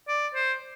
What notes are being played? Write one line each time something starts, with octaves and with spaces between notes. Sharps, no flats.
D5
C5